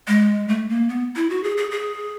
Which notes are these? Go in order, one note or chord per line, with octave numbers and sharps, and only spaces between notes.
G#3
A3
A#3
B3
E4
F#4
G#4
G#4
G#4